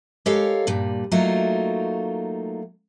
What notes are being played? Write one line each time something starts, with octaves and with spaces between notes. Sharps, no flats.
G#3 G4 A4 A#4 C#5 F5
G2 A#2 G3
F#3 A3 A#3 D#4 F4 F#4